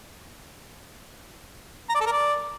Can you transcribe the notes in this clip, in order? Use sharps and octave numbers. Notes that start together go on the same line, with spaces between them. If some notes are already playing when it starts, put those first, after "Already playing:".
A#5
D5
A4
A#4
D5